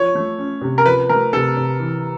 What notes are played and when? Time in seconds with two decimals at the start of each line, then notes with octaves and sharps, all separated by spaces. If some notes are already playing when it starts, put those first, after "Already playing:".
Already playing: F3 C#5
0.15 A3
0.38 C#4
0.61 C3
0.78 A#4
0.85 F3 B4
1.09 A3 A#4
1.33 C3 A4
1.57 C3
1.79 E3